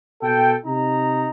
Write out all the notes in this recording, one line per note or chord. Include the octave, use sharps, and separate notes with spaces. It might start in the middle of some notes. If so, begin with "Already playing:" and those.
B2 A4 G5
C3 D#4 A#5